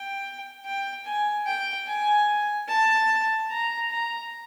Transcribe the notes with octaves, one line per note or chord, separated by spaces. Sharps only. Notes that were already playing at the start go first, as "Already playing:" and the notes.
Already playing: G5
G5
G#5
G5
G#5
A5
A#5
A#5